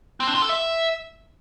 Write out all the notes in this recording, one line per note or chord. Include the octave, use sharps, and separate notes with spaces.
C4
D4
F4
A4
E5